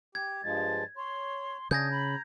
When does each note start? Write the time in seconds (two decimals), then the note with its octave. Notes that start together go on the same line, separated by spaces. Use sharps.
0.15 G4 G#6
0.44 G2 F3 G#3 A6
0.97 C#5 C6
1.71 C#3 D4 D#6 G6 G#6 A#6
1.91 A#5 B5